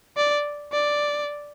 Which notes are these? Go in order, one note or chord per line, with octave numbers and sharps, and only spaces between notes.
D5
D5